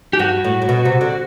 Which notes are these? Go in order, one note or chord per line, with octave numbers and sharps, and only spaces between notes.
G4
G2 F#4
A2
A2
B2
C3
D3